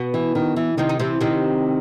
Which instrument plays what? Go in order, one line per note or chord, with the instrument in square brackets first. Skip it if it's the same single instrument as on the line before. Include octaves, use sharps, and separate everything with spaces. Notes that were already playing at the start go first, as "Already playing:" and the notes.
Already playing: [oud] B2 B3
[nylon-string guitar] E3
D#3
E3
[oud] C3 C4 [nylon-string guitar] D#3
[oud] D#4
[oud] C3 C4 [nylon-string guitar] E3
[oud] C3 C4 [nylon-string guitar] D#3